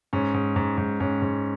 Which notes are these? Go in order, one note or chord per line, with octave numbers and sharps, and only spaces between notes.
G#2 C#4
G#2
G#2
G#2
G#2 C#4
G#2